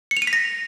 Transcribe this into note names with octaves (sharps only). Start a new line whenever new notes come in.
C#7
F7
D#7
B6
A#6